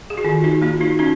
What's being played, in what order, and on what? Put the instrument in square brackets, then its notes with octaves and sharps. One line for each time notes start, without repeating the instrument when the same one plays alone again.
[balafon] G#4
F#4
D#3 F4
D#4 F#4
A#3 F4
D#4 F#4
C#4 D#4 F#4